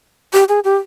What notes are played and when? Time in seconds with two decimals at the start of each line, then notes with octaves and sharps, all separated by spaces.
0.33 G4
0.49 G#4
0.64 G4